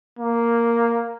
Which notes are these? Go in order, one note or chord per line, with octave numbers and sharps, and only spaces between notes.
A#3